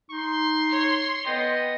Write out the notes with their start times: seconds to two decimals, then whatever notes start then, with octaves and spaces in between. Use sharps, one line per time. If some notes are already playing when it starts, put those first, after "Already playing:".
0.11 D#4 C6
0.70 C#5
1.26 B3 D#5 G5